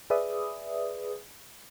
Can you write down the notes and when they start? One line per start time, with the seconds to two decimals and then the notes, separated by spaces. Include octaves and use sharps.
0.10 G#4 B4 D5 E5 D#6